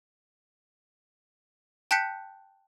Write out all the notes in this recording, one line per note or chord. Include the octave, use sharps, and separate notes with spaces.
G5 A5 F#6 G6 B6 C#7